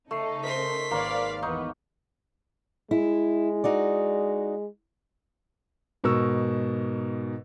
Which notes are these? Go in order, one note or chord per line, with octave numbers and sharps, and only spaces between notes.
C#3 A3 D#4 A4 C#6 C7 C#7
A#4 C5 D#5 C6 B6
G#1 A#3 B4 C#5 D5 F5 A#5
E2 B3 D#4 C#6
G#3 E4
D#4 F#4 D5
G#2 B2 A#4 C#6 E6